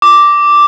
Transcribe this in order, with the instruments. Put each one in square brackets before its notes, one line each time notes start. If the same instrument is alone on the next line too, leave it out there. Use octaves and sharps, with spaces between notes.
[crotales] D6